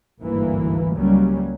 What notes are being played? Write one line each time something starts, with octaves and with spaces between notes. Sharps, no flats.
G#1 D2 G2 E3 A#3
C#2 F#3 G3 A#3 C#4